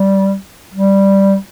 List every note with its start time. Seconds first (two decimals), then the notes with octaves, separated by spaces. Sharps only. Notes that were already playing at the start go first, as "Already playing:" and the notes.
Already playing: G3
0.74 G3